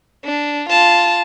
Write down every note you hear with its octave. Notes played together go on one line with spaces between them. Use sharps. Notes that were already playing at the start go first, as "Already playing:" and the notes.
D4
F4 A5